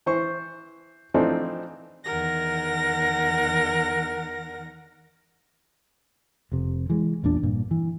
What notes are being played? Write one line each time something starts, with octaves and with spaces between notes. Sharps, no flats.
E3 C5 C#6
E3 F3 A3 C4 D4 D#4
E2 D#3 A#4 F#5 A#6
F1 C3
E3 G#3
A1 E2 A#2 D4
G2 A#2
E3